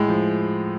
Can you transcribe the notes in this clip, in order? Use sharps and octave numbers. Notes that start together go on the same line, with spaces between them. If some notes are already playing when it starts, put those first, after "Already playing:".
Already playing: A2 G#3
F3